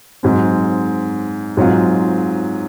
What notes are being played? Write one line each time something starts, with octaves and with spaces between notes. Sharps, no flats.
G#2 F#3 C4
G#2 F#3 C4 F4